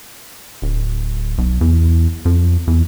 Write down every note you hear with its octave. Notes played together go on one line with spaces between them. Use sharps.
D1
B1
E2
F2
E2